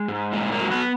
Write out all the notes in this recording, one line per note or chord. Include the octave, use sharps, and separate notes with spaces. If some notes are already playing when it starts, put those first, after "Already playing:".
Already playing: G#3
G#2
A#2 G#3
A#3
F#3
B3